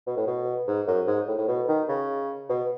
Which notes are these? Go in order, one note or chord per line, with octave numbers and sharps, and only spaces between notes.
B2
A2
B2
G#2
F#2
G#2
A2
A2
B2
D#3
C#3
B2